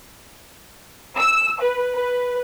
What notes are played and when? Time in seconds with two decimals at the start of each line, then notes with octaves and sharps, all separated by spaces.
1.18 E6
1.61 B4
1.94 B4